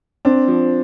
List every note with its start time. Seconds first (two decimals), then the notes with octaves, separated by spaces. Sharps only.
0.25 C4 D4
0.48 F3